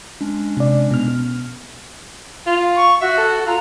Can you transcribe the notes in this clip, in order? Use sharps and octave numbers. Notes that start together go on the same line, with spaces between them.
G#3 C#4 D4
C3 D5
B2 F6
F4
C#6
F#4 E5
A4
F4 A#5